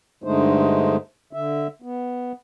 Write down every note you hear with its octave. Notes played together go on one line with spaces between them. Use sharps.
G2 D3 G#3 A3 D#4 C5
D3 E5
B3